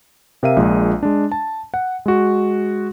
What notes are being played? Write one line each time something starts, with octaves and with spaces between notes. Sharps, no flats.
C3 A#4 E5 F5 D#7
A#1 A#2 G#3
G#3 D4
A5
F#5
G#3 F#4